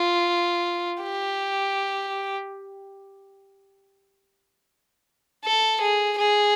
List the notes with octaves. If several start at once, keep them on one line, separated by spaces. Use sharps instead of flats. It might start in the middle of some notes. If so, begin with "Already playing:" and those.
Already playing: F4
G4
A4
G#4
G#4